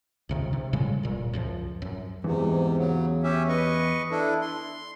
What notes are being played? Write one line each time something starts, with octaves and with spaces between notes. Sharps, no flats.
C#2 C3 D#3
C3
A2 C#3 G3 G#3
D1 A#2
C#2 F#2 F3
F#2
E2 G#2 C3
C#3 F#3
C#4 G4 E5
B4 D#5 C#6
D4 E4 A4
C6